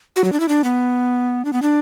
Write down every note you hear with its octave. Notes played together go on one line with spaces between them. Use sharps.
F#4
F#3
D4
E4
D4
B3
D4
B3
D4